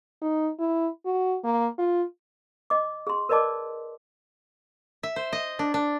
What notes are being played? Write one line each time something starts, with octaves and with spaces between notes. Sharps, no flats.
D#4
E4
F#4
A#3
F4
D#5 D6
G#4 C6
A#4 B4 D5 D#5 A5 D6
E5
C5
D#5
D4
D4